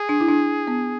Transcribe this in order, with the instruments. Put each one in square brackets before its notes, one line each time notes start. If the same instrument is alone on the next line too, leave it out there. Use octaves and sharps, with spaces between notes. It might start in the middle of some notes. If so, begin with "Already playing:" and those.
Already playing: [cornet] G#4
[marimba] D4
E4
D4
B3